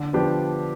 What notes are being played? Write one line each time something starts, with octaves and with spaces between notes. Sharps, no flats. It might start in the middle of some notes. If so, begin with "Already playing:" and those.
Already playing: D3
F3 B3 D4 G4